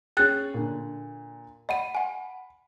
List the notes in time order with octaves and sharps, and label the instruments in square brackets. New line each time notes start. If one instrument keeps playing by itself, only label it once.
[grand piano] C#4 G#4 [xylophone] G5 F#6 A6
[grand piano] A#2 D3
[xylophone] D#5 F#5 D#7 [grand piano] B5
[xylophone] F#5 G#5